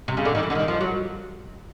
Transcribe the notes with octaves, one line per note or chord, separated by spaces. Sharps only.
C3
C#3
D3
D#3
E3
D3
D#3
F3
F#3